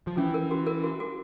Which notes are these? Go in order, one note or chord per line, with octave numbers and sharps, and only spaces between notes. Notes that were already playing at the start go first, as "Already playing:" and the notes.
F3
E3 C#4
A#4
F#4
A#4
F#4
F#4